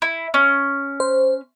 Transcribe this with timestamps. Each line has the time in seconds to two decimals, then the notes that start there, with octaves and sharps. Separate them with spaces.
0.02 E4
0.34 C#4
1.00 C5